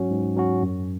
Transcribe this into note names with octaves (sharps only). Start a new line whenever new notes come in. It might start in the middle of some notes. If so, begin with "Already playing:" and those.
Already playing: G#2 F#3 C#4 F#4
G#2
F#3 C#4 F#4
F#2